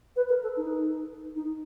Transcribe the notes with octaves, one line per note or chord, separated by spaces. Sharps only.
B4
A#4
A4
D#4
D#4